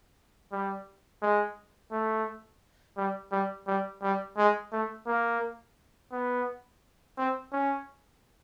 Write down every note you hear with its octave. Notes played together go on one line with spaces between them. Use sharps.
G3
G#3
A3
G3
G3
G3
G3
G#3
A3
A#3
B3
C4
C#4